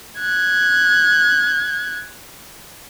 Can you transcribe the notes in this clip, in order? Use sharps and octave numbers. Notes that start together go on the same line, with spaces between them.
F#6 G#6